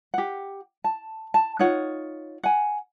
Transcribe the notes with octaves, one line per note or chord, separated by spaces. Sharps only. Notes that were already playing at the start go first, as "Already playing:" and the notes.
G4 F#5
A5
A5
D#4 F4 C#5 F#5
F#5 G#5